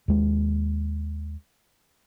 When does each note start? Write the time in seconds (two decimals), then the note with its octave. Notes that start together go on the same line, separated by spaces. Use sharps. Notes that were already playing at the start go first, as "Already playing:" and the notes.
0.08 D#2 G#3